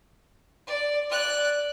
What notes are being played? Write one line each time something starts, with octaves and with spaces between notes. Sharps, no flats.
D5
D5 F#6